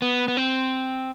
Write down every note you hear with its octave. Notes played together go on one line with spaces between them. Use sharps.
B3
B3
C4